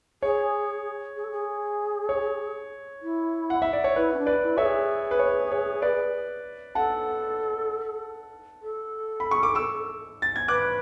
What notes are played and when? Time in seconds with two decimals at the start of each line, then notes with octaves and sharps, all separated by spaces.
0.22 G#4 C#5
1.16 G#4
1.24 A4
1.31 G#4
2.09 C#5
3.02 E4
3.50 F#5
3.62 E5
3.73 D5
3.84 C#5
3.96 E4 B4
4.14 C#4
4.18 D4
4.26 B4 D5
4.42 E4
4.57 A4 C#5 E5
4.66 G#4
5.11 B4
5.19 C#5
5.52 C#5
5.82 B4 D5
6.75 A4 F#5 A5
8.62 A4
9.20 B5
9.31 C#6
9.43 D6
9.55 C#6 E6
10.22 A6
10.36 G#6
10.48 B4 D6 F#6